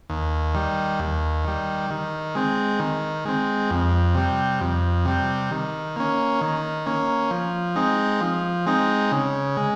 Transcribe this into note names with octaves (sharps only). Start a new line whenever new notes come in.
D#2
D#3 G3
D#2
D#3 G3
D#3
G#3 C4
D#3
G#3 C4
F2
C3 G3
F2
C3 G3
D#3
A#3 C#4
D#3
A#3 C#4
F3
G#3 C4 D#4
F3
G#3 C4 D#4
C#3
G#3